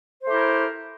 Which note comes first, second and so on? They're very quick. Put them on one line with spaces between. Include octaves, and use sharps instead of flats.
C5 A3 G4 E4 A#4